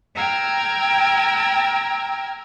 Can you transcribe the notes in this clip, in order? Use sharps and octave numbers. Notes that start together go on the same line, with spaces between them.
G5 A#5 E6 F6 G#6